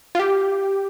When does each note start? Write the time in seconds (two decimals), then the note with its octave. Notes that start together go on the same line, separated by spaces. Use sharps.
0.15 F4
0.20 G4